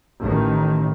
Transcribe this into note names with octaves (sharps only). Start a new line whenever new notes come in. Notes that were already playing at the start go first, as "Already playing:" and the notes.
A1 D#3